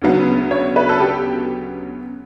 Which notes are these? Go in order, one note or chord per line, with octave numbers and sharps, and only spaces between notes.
D2 C#3 F#3 B3
C#5
B4
A4
G4